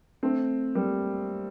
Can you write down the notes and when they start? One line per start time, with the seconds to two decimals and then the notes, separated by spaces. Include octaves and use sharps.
0.23 A3 C4
0.75 G3 A#3